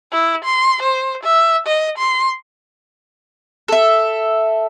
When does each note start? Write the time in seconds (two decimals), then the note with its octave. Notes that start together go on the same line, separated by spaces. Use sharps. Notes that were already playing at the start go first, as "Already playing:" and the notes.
0.12 E4
0.44 C6
0.83 C5
1.23 E5
1.67 D#5
1.98 C6
3.68 A4 E5